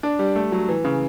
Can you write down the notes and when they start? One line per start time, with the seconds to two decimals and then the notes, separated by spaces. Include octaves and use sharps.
0.03 D4
0.19 G3
0.36 A3
0.52 F#3
0.69 E3
0.85 C#3